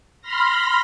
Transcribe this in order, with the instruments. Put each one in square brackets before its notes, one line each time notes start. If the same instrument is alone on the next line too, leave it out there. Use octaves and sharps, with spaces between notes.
[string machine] B5 C6 F6 A#6